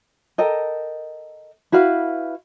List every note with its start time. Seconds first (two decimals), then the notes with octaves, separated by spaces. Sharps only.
0.38 A4 A#4 D#5 G5
1.72 E4 F#4 B4 F5